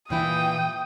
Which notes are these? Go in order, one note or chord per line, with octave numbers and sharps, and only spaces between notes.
A#2 E3 E4 G5 D#6